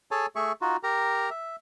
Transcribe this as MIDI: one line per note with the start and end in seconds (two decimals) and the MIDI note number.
0.11 0.26 68
0.11 0.26 69
0.11 0.26 73
0.11 0.26 80
0.11 0.26 81
0.36 0.52 57
0.36 0.52 68
0.36 0.52 76
0.36 0.52 85
0.62 0.76 63
0.62 0.76 65
0.62 0.76 66
0.83 1.30 67
0.83 1.30 70
0.83 1.30 82
1.30 1.56 76